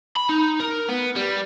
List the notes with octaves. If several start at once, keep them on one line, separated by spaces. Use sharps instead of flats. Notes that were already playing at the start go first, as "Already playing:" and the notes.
B5
D#4
A#4
B3
G3